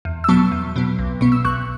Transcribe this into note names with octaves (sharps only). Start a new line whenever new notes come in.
E2
E6
B2 F#3 B3 A5 C#6
E2
B2 F#3 B3
B1
B2 B3 C#6
E6
B1 C#6 F#6